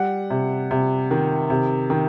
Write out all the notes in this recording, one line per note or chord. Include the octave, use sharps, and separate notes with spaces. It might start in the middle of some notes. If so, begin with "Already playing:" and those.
Already playing: G3 F#5
C3
C3
D#3
C3
D#3